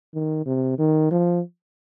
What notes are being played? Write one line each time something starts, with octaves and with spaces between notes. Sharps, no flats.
D#3
C3
D#3
F3